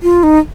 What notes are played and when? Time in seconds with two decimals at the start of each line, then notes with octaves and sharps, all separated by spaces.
0.03 F4
0.23 D#4